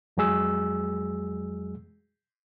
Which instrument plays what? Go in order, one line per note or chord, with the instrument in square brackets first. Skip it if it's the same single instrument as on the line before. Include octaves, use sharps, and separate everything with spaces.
[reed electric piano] F2 F#3 G#3 G#4 E6